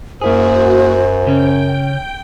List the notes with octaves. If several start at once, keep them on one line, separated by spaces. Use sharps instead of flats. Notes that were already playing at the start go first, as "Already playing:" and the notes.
F#2 A#3 E4 F#4 G#4 C5
C#3 C#4 G5